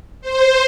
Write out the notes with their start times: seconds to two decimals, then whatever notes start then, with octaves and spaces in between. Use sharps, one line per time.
0.21 C5